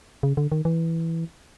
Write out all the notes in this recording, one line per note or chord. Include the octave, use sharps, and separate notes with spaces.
C#3
D3
D#3
E3